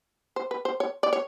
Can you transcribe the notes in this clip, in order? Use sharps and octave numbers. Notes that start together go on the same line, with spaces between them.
C5
B4
C5
C#5
D5
C#5